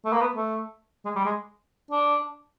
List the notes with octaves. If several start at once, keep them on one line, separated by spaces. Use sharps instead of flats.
A3
A#3
B3
A3
G#3
G3
G#3
D4